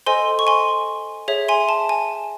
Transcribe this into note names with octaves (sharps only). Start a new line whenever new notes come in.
A4 C5 D#5 G#5 C6
C#6
G#5 C6
G#4 C#5 E5
G#5 C6
A5
G#5